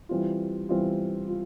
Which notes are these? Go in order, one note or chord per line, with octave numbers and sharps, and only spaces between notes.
E3 G3 C4 F4
E3 G3 C4 F4
F4